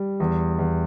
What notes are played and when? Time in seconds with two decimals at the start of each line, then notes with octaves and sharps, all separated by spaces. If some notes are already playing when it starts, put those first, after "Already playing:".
Already playing: G3
0.20 E2
0.59 E2